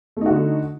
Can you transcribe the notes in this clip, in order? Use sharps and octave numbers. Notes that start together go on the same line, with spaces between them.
D3 A3 D#4 F#4